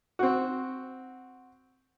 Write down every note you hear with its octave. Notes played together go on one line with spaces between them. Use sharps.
C4 F#4